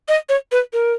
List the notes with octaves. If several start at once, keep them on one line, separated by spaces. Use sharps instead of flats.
D#5
C#5
B4
A#4